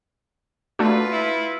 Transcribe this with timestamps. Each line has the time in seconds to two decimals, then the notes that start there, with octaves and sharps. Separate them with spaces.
0.79 A3 D4 F4 F#4 B4
1.11 E4